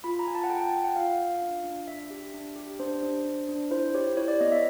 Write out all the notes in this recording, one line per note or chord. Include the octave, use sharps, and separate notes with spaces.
F4 B5
A#5
F4 G#5
A5
F#5
A4 G5
A5
F4 G5
F#5
F4 F5
F4
D4
D4
D4 E5
G4
D4
G4
D4 C5
D4
D4
D4
E4 C5
G4 C#5
E4 C#5
D5
B3 D#5
E5